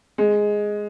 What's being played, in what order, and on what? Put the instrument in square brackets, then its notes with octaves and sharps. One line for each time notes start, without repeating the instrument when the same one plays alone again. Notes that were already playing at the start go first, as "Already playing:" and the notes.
[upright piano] G#3